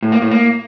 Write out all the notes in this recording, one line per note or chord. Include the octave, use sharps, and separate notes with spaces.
A2
A#3
A2
A#3